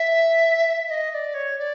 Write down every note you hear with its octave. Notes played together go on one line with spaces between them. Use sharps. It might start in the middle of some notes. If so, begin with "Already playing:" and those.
Already playing: E5
E5
D#5
D#5
D5
C#5
D5